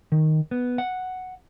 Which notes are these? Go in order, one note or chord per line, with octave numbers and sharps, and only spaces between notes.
D#3
B3
F#5